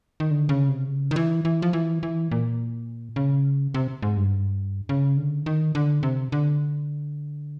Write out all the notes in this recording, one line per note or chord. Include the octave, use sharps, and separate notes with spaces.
D#3
D3
C#3
C3
C#3
D#3
E3
E3
F3
E3
E3
A#2
C#3
C3
G#2
G2
C#3
D3
D#3
D3
C3
D3